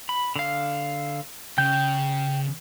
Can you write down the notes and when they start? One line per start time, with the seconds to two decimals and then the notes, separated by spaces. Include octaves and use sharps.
0.09 B5
0.36 D3 F5
1.58 C#3 G5 G6